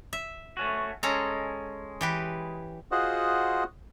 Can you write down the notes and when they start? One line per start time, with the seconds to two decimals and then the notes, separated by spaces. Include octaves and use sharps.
0.13 E5
0.57 A3 C#4 F#4
1.03 G#3 C#4 A4 A#5
2.01 E3 G4 B4
2.92 F4 F#4 G#4 C5 D#5 F#5